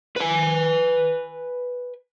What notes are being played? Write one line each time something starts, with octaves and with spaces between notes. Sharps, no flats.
B4 G#5